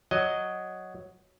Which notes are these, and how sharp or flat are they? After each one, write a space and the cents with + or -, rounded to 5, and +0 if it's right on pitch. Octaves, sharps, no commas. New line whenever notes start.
F#3 +0 D#5 +0